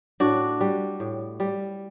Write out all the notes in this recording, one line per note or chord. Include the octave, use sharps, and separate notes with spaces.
A2 D4 F#4
G3
A2
G3